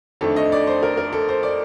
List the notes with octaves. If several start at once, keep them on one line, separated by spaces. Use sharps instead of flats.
F2 D#3 A3 D4 A4
D#5
D5
C5
A#4
A#4
A4
C5
D5